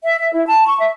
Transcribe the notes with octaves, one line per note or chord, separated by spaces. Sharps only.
E5
E5
E4
A5
C#6
E5